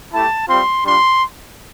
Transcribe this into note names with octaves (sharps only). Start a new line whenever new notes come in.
A3 E4 G4 A5
G3 C4 F4 C6
G3 D4 F4 C6